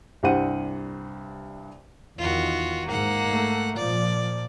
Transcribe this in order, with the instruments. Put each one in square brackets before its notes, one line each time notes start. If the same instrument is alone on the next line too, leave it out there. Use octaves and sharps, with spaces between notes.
[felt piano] C2 G2 C5 F#5 D#7
[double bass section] E2 D#3 [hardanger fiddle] F4 F#4
[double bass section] G#2 [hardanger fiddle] A#3 F#5
[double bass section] A3
[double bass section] A#2 F3 [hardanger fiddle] D5